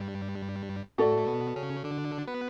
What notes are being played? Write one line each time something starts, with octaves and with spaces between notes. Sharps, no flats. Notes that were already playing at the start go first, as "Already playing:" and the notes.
Already playing: G2 G3
A2 A3 F#4 A4 D5
A3
B2 B3
C#3 C#4
D3 D4
B3 B4